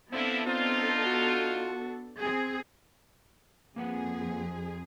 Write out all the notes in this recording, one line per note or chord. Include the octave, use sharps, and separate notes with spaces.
D3 F3 B3 C4 D4 E4 A4
C4 D#4 F4
F#4
C4 G#4
F2 A#3 G#4 B4 F#5